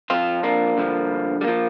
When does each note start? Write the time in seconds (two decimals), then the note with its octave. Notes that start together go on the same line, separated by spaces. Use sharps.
0.10 F2 F3 C4 F4
0.43 A#3 D4
0.77 G2 D3 F3
1.41 G3
1.44 F3 A#3